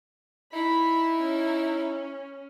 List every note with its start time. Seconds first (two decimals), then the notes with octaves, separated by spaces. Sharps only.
0.54 D#4 E4 B5
1.22 C#4